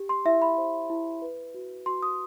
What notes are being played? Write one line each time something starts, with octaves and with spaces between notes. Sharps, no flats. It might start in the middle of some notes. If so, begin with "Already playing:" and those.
Already playing: G4
C6
E4 E5
B5
C5
E4
B4
F#4
F#4 C6
D#6